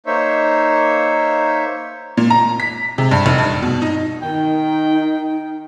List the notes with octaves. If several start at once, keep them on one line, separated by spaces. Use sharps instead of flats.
A#3 D#4 C5 C#5 E5
A#2
A#5
B6
C3
G2
F1
G2
B2
D#4
D#3 D#4 G5